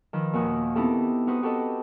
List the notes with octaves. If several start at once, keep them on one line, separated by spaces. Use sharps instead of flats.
D#3 F3 B4 E6
D#2 A#2 F#4 D#6
B3 C4 D#4 E4 G4 A4
D#4 F#4 B4 C5 D#6
F#4 G4 A4 B4 D#5